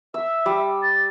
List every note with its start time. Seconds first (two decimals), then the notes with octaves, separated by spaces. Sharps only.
0.14 E5 E6
0.46 G3
0.82 A6